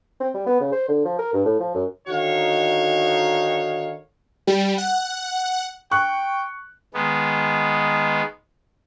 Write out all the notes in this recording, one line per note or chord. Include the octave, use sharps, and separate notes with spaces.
C4
G3
B3
C#3
C5
D3
F3
A#4
G2
A2
F3
F#2
D3 D#3 D#4 F#4 C#5 F5
G3
F#5
G5 C#6 F#6
D#3 G#3 B3